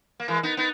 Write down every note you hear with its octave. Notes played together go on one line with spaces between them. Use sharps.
A#3
E3 G#3
B3 D#4
B3 D#4